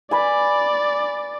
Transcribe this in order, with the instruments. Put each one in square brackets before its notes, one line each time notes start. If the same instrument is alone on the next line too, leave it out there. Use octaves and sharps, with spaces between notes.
[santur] B4 G#5 [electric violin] D5